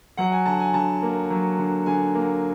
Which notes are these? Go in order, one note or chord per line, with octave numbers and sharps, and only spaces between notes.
F#3 F#5
G#5
D3 A5
G#5
D3 A5
A#3
F#3
D3
D3 G#5
A#3